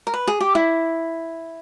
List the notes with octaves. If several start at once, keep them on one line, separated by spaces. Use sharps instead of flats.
A#4
B4
G#4
G4
E4